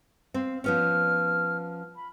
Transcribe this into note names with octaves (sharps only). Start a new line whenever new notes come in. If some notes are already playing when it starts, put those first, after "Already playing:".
C4 F5
F3 B3 C#4 F6
B5